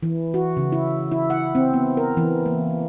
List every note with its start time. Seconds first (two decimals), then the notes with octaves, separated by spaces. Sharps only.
0.03 E3
0.34 F#4
0.57 C#3
0.72 E4
1.11 E4
1.30 F#5
1.55 C4
1.74 B3
1.97 A#4
2.17 E3
2.46 A#3